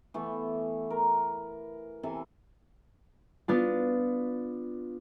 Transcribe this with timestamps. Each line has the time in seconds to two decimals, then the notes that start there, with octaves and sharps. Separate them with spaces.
0.14 E3 A3 B3
0.90 A#4
2.03 C3 E3 A4 G#5
3.48 B3 D4 F4